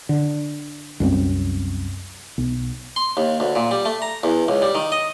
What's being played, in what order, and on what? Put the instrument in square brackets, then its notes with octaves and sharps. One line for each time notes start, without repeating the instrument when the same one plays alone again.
[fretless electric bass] D3
C2 F#2 F#3 C4
B1
[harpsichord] C6
D#2
D2
A#2
G3
A3
A#5
E2
C#2
G3
D#3
D#5